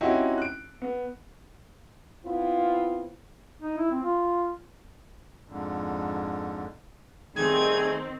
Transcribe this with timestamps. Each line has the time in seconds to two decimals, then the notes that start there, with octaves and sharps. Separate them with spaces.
0.01 C4 C#4 D#4 E4 F#4 G4
0.38 F#6 D7
0.82 B3
2.25 B3 C4 E4 F4
3.62 D#4
3.78 E4
3.91 C4
4.03 F4
5.48 F2 G#2 D3
7.36 D#3 G3 A3 C4 D#4 G#4 G#6